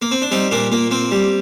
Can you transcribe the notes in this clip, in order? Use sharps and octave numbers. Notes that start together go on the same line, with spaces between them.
A#3
C4
D4
G3 C4 D#4
A#2 A#3 D4
A#2 A#3
A#3 C4
G3